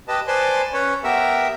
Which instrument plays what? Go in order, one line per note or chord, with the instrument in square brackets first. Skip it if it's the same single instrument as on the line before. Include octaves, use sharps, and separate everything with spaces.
[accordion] G4 B4 D#5 A5
B4 C5 D5 G#5 A5 C6
C#4 B4 C#5
B3 G4 A#4 E5